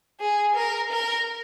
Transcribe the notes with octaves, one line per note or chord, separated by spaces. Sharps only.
G#4
A#4
A#4